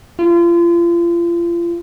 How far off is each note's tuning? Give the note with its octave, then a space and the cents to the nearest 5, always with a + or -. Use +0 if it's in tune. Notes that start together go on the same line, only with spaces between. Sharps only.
F4 -35